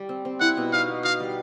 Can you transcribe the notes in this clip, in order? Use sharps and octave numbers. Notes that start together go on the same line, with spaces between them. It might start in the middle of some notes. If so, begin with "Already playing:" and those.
Already playing: G3
C4
C4
E4 F#5
B2
D#4 F5
F#4
F#4 F5
G3